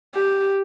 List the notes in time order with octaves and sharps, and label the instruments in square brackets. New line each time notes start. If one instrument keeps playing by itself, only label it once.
[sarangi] G4